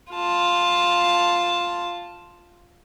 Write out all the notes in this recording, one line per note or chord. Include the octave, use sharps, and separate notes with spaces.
F4 A5